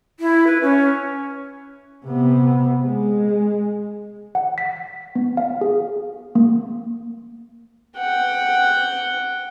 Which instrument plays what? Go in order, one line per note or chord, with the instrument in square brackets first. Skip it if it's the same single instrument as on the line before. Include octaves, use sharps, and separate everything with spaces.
[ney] E4
B4
C#4
[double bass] C3 B3
G#3
[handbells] F#5
B6
B3
F5
G#4
A#3
[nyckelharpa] F#5 G5